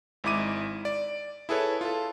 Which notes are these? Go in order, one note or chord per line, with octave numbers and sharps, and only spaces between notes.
G#1 G#2 E4 D6 D#7
D5
E4 G#4 A4 B4 C#5
F4 A4